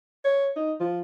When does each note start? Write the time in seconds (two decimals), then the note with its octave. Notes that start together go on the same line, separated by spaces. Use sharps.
0.24 C#5
0.56 D#4
0.80 F3